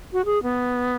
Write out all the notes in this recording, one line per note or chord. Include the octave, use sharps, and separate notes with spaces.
F#4
G#4
B3